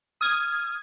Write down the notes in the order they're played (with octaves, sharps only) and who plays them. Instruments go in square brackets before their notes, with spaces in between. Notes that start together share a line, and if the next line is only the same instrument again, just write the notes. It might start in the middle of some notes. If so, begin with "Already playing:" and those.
[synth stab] D#6 G#6 [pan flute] F6